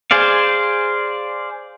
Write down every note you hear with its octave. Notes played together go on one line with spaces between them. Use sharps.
G#4 C5 D5 F5